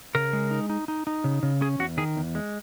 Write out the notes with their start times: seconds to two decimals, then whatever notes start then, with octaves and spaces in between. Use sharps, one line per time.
0.15 C#3 A#4
0.33 G#3
0.51 D#4
0.70 D#4
0.88 D#4
1.07 D#4
1.24 C#3
1.43 C#3
1.61 C#4 G#4
1.79 E2 F#4
1.98 D#3 G#4
2.16 E2
2.35 G#3